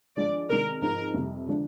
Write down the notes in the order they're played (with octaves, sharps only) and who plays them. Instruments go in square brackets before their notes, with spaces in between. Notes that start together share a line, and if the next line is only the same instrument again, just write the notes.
[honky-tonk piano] G2 F3 G#3 D4 [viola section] D5
[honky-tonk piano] C3 D#3 G#3 [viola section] A#4
[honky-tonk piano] G#2 F3 C4 D#4 [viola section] A#4
[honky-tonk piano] F2 C3 G3
D3 F3 G#3 D4